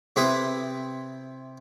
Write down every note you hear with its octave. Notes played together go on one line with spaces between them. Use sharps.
C3 C4 E4 B4 D#6